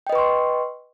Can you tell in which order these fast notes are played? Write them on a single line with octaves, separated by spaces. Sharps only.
G5 D#5 B4 C#6 C6